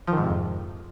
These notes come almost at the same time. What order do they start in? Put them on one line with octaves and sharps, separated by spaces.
F3 D#3 G#2 C3 F2